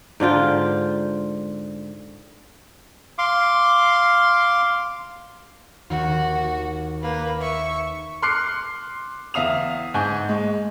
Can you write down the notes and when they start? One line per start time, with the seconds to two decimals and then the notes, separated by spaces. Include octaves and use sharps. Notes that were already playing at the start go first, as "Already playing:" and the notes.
0.20 G#2 D3 F4 G5
3.18 F5 C6 D6
5.90 D#2 F#4
7.02 A#3 B4
7.41 E5 C#6
8.22 C6 D6 F6 F#6 C7 C#7
9.34 E2 E5 F5 D#6 F7
9.94 G#2 F#5 G#5 C#6 G6
10.29 G#3